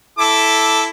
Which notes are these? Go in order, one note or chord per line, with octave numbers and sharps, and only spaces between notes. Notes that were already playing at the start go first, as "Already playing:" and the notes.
E4 A4 D6